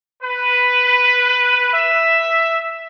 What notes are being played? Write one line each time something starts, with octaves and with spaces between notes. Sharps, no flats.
B4
E5